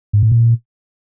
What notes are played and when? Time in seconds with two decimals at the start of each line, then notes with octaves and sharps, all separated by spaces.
0.13 G#2
0.23 A2
0.32 A#2